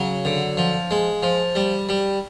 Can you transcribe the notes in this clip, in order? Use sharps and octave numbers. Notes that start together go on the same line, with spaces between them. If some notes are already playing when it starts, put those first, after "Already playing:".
Already playing: C#3 F#3
D3
F3
G#3
F3
G3
G3